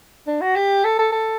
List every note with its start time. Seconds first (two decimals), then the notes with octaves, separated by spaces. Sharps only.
0.27 D4
0.41 F#4
0.55 G4
0.84 A4
0.98 A4
1.12 A4